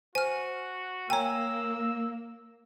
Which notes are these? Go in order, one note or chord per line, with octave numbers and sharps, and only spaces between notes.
F#4 C5 G#5 F6
A#3 C#5 G5 G#5 A#5 E6